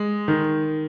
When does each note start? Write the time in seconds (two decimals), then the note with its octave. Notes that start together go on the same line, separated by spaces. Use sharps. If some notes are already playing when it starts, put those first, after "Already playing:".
Already playing: G#3
0.28 D#3